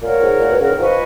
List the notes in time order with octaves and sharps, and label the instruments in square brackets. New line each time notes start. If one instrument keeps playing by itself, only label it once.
[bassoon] A#2 [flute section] A#4 C#5 F#5
[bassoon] G#2
A#2
B2
C#3
D#3
[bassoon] F3 [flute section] B4 D#5 G#5 C#6